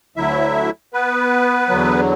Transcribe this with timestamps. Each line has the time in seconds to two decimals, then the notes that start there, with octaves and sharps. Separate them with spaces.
0.16 D2 D3 F#3 E4 E5
0.93 B3 B4
1.69 E2 D3 F#3